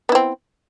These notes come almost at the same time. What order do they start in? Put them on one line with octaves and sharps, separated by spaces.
B3 E4 C4